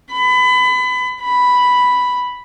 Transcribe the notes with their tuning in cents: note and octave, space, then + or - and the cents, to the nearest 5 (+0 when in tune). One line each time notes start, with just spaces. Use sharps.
B5 +30
B5 +0